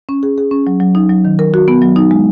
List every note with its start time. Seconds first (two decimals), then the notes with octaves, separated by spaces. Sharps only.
0.09 C#4
0.23 G#4
0.38 G#4
0.51 C#4
0.67 F#3
0.80 F#3
0.95 D#4
1.09 F#3
1.24 D#3
1.39 A#4
1.54 F#4
1.68 B3
1.82 F#3
1.96 D#4
2.11 G#3